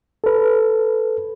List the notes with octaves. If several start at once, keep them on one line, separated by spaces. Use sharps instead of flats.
A4 B4